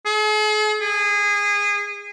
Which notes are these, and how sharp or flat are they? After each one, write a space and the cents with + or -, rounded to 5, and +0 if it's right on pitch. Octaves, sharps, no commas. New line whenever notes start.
G#4 +45
G#4 -20